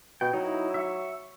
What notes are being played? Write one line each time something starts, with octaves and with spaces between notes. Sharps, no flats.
B2 G5
F#3 D#4 E4
E5 C#6